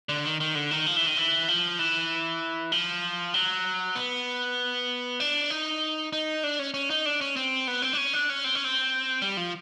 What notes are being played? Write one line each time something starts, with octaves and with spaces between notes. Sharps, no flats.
D3
D#3
D#3
D3
D#3
F3
E3
D#3
E3
F3
E3
F3
F#3
B3
D4
D#4
D#4
D4
C#4
C#4
D#4
D4
C#4
C4
B3
C4
D4
C#4
D4
C#4
C4
C#4
C4
G3
F3